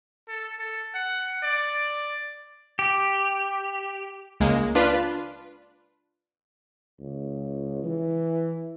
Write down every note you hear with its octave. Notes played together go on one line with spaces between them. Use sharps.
A4
A4
F#5
D5
G4
C#2 G#3 A#3
D4 F4 B4
C#2
E3